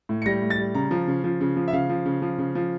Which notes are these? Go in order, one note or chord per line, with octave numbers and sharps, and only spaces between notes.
A2
C#7
G3 A#6
A2
A6
G3
C#3 A#5
F3
C#3
F3
C#3
F3
E5
C#3 F5
F3
C#3
F3
C#3
F3